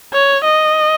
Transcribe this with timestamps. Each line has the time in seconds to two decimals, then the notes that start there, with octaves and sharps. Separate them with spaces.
0.13 C#5
0.44 D#5